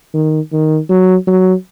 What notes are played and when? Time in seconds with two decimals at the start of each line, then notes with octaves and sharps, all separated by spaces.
0.14 D#3
0.52 D#3
0.89 F#3
1.27 F#3